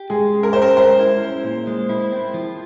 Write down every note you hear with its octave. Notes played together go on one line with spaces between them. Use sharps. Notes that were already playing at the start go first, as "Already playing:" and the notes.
Already playing: G4
G#3 G#4
C#4
A#4
C#4 C5
A#4
G#3 C5
E4
C#4
A#2
G#3
E4
C4
F3